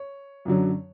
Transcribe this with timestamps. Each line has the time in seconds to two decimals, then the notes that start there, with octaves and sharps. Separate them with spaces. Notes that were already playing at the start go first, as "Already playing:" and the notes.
Already playing: C#5
0.45 F#2 D3 F#3